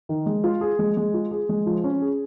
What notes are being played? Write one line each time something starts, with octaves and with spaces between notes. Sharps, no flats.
D#3
G#3
F4
G#4
G#3
G#3
F4
G#4
G#3
F3
C#4
G#4